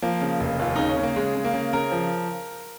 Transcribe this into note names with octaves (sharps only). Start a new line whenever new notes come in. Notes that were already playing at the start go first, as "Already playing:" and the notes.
F3 A#3
C#3
F1
D#2 F4
C#3 D#4
C#4
C#3
A#3
C#3 G#3
C#3
A#3
C#3
C#3 A#4
F3